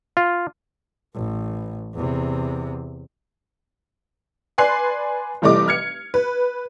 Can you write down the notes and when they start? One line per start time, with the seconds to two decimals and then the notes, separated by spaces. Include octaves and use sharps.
0.17 F4
1.15 A1
1.94 E2 C3
4.58 B4 D5 G#5 C6 F#6 C7
5.42 F1 E3 G3 A3 D#5 D6
5.68 F6 G#6 C#7
6.14 B4